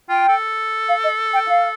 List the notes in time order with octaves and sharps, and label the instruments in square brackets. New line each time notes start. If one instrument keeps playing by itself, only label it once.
[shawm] F4 [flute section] G5
[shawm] A4
[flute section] F5
D#5
G5
F5